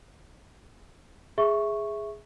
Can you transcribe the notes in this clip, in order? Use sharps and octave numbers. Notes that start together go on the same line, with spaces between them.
G#4 E5 C#6